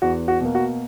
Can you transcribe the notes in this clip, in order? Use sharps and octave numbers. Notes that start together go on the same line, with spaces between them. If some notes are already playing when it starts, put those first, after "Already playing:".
E2 F#4
F#4
B2 A#3
F#4